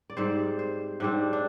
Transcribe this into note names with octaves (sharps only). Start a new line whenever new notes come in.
D5
G#2 G3 C4 C5
C5
G#2 G3 C4 D4
D4